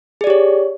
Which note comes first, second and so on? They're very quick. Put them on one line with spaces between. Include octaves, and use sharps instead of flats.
G#4 D5 G4 C#5